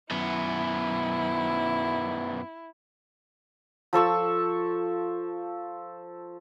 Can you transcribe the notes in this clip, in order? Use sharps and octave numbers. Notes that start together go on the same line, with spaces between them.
F#2 B3 E4
F3 A4 C#6 E6